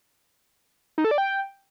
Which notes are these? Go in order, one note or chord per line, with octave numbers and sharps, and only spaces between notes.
D#4
A4
D5
G5